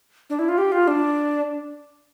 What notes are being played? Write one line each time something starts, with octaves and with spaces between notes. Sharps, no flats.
D4
E4
F4
G4
F4
D4